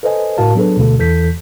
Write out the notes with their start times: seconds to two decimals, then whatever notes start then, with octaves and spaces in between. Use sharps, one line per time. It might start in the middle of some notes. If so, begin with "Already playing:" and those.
0.03 A4 B4 C5 D#5 G#5
0.38 G1 A2 F#4 A#4 F5 A5
0.55 F#3 B3 D4 G#4 A4 B4
0.77 D2 B2 D3 A3 A4
0.99 E2 E3 A4 G6 B6